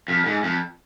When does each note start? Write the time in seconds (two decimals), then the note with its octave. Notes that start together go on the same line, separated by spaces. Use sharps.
0.08 F2
0.26 G#2
0.43 F2